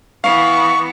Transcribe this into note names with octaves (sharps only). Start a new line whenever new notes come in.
E3 B3 F5 C#6